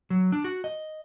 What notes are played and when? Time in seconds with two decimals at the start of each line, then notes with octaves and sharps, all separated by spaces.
0.10 F#3
0.32 D4
0.44 F#4
0.64 D#5